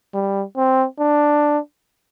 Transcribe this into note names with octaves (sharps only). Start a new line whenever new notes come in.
G3
C4
D4